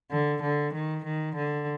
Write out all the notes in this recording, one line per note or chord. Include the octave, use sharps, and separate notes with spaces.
D3
D3
D#3
D#3
D3